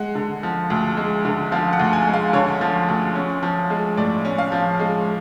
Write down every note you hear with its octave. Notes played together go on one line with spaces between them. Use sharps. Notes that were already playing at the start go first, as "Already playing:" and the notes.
Already playing: G#3 F#5
D3
F3
D2
G#3
D3
F3 F5
F#5
D2
G#5
G#3
F5
D3 C#5
F3
D2
C#4
F3
G#3
A2 D5
C#4
F5
F3
G#3